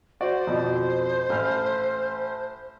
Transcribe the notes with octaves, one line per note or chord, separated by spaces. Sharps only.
F#4 C5 D5
F2 B2
A1 F6